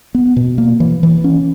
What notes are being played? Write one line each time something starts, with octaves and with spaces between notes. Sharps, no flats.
B3
B2
A#3
E3
E3
C#4